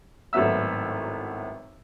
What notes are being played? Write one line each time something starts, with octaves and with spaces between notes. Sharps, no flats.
G#1 A2 F#3 B3 E5 E6